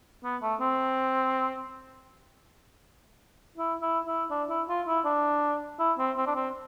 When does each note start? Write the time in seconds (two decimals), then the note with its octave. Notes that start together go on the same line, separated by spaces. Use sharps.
0.24 B3
0.42 A3
0.60 C4
3.57 E4
3.82 E4
4.07 E4
4.30 D4
4.49 E4
4.69 F4
4.87 E4
5.05 D4
5.79 E4
5.98 C4
6.17 C4
6.27 D4
6.35 C4